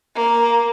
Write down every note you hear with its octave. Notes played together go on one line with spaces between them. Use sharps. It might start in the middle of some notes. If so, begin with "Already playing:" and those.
A#3